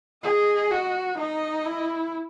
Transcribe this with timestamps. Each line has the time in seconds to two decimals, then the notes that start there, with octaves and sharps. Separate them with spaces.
0.24 G#4 D#5
0.71 F#4
1.18 D#4 D#5
1.65 E4